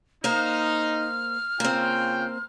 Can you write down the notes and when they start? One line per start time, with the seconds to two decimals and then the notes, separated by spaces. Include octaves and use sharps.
0.24 A#3 D#4 C5 F5 F6
1.60 C#3 A#3 C4 F4 G5